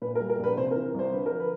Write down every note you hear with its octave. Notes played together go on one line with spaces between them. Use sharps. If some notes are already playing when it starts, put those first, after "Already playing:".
A#2 B4
A#4
G3
A#4
A#1 B4
C3 C5
A#4
E3
C2 C5
D3 B4
A#4
F3
B4